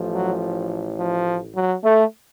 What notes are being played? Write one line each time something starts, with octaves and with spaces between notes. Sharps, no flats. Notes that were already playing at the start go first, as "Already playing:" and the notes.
Already playing: A1 A2 F3
F#3
F3
F#3
A3